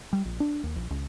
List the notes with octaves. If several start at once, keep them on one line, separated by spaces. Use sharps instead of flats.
G3
A#1
D4
D#2
A#1
C#2